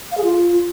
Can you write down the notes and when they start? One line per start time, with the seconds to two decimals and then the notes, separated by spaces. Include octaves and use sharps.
0.12 F5
0.18 G#4
0.23 F4